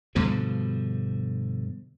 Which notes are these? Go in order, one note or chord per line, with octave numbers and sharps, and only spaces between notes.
G2 B2 D3 F3